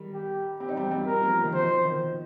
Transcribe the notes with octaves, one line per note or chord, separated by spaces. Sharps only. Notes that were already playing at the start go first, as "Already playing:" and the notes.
Already playing: D#3 G3
G4
C4 G4
D#4
G3 C4
G3 C4
A#4
F3 A#3
D#3
F3 C5
D#3